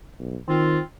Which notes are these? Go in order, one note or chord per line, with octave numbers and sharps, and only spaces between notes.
B1
D#3 C4 F4